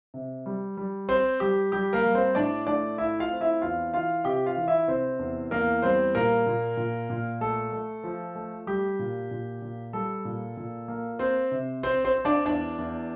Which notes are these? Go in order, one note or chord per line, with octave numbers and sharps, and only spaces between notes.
C3
G3
G3
C4 C5
G3 G4
G3 G4
A#3 A#4
G3
C4 C5
A2 D4 D5
A3 D4 D5
A3 E4 E5
F4 F5
C4
E4 E5
E2 F4 F5
E3 F4 F5
C3 G4 G5
F4 F5
E3
E4 E5
C3 C4 C5
E2
E2 A#3 A#4
G3 C4 C5
A#2 A#3 A#4
A#2
A#2
A#2
A3 A4
A3
F3
A3
G3 G4
A#2
A#2
A#2
G3 A4
A#2
A#2
A#3
C4 C5
C3
C4 C5
C4 C5
C4
D4 D5
E2 D4 D5
E2